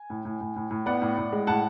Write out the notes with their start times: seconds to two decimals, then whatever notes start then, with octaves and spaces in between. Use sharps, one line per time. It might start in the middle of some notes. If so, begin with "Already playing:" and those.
Already playing: G#5
0.10 A2
0.25 A2
0.41 A2
0.56 A2
0.71 A2
0.86 B3 D5 F#5
1.02 A2
1.18 A2
1.32 G#3
1.47 A2 F#5 A5